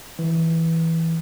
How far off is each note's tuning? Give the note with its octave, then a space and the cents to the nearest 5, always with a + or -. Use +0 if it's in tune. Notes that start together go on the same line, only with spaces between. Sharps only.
E3 -10